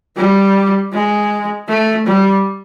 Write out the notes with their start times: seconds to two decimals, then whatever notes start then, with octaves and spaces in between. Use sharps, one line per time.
0.17 G3
0.93 G#3
1.68 A3
2.07 G3